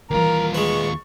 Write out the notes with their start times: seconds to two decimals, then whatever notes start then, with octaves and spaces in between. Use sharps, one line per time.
0.11 D#2 E3 G3 F4 A#4
0.55 G#3 B4 C#6